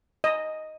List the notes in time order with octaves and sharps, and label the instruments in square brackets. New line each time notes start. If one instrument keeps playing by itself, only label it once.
[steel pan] D#5